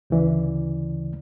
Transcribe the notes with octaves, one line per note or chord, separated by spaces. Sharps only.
D2 C#3 E3 D5